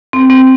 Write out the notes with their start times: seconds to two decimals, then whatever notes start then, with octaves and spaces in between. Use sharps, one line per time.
0.13 C4
0.30 C4